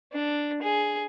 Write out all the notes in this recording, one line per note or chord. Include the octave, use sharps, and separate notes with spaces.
D4
G#4